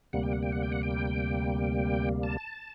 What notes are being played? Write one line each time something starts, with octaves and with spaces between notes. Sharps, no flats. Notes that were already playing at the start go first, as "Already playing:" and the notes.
D2 C3 G3 A#3 F#5
G5
F#5
G5
F#5
G5
F#5
G5
A5